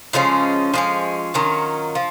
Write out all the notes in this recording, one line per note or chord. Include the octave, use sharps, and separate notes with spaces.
C#3 F3 G#3 C#4
F3 G#3 C#4
D#3 F#3 C#4 F4
F3